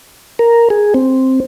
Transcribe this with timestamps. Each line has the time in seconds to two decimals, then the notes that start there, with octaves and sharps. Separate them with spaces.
0.39 A#4
0.70 G#4
0.94 C4